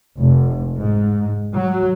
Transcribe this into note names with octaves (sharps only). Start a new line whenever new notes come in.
F1
G#2
F#3